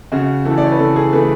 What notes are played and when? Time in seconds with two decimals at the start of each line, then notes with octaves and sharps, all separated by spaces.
0.12 C#3 F#4
0.45 E3 A3 A4
0.58 D5
0.64 C#5
0.72 B4
0.79 C#3 A4
0.96 G#4
1.12 E3 A3 B4